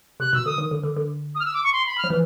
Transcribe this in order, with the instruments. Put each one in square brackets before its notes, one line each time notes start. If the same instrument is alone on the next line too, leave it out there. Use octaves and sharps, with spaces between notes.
[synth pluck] C3 [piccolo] F#6
[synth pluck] B2 [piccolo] E6
[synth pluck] D3 [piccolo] D#6
[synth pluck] D#3
D3
D3
D3
[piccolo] D#6
F6
E6
D6
C#6
C6
B5
F6
[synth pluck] F3
E3